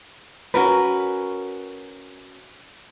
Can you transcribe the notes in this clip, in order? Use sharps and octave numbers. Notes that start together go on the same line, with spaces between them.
C#4 F#4 A#4 B4